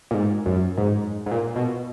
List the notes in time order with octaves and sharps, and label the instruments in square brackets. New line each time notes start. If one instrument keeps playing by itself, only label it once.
[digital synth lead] A#2
G#2
F#2
G#2
G#2
A#2
B2